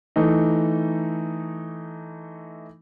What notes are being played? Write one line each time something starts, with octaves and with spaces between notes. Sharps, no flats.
E3 A3 D#4